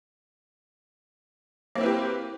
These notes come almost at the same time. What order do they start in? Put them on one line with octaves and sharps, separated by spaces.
A#3 C4 E4 B4 G4